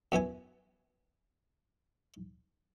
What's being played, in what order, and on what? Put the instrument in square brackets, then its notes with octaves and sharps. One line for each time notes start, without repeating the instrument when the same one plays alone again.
[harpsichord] F#2 B3 E4 G#5